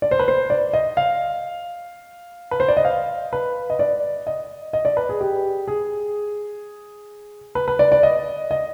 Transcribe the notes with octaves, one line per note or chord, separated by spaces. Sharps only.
D5
C5
B4
C5
D5
D#5
F5
B4
C5
D5
D#5
F5
B4
D#5
D5
D#5
D#5
D5
B4
G#4
G4
G#4
B4
B4
D5
D5
D#5
D#5